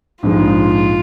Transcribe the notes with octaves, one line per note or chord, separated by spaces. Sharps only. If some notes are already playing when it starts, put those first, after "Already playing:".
A#1 G#2 F3 G#3 F4